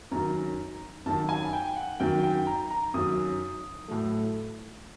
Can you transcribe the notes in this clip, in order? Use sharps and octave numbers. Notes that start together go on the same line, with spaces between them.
F#2 D#3 F#3 A#5
F#2 D#3 F#3 A5
G#5
G5
F#5
F#2 D#3 F#3 G5
G5
A#5
A#5
F#2 D#3 F#3 D#6
A2 F#3 A3